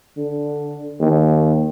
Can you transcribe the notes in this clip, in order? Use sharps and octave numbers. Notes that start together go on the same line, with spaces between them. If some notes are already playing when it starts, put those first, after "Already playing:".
D3
D#2